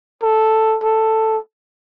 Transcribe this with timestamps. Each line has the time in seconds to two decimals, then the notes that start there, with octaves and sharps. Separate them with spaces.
0.23 A4
0.83 A4